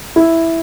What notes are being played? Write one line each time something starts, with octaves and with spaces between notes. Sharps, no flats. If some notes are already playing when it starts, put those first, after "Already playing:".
E4